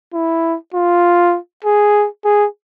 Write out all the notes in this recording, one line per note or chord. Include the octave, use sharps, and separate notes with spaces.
E4
F4
G#4
G#4